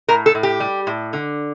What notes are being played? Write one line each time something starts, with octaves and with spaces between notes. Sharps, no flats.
A2 A#4
A4
A2
G4
G3
A2
D3